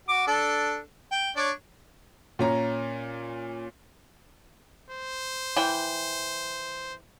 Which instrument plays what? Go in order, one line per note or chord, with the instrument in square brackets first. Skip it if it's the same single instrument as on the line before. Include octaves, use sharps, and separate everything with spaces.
[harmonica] F#4 D6
D4 A4
G5
D4 C#5 D5
[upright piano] A#2 C#4 A#5
[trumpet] C5
[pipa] E3 G5